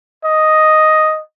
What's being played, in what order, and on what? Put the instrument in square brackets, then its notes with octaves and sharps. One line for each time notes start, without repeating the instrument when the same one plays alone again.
[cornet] D#5